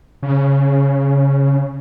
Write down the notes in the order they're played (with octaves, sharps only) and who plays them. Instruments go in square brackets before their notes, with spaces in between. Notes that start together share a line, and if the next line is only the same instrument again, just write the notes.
[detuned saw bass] C#3